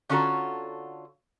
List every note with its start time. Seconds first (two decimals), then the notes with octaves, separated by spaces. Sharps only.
0.09 D3 C#4 F4 F#4 A4 A#5